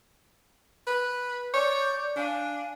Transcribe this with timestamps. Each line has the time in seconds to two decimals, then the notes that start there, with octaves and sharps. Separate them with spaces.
0.87 B4
1.54 C#5 D5 D6 G6
2.16 D4 F5 G#5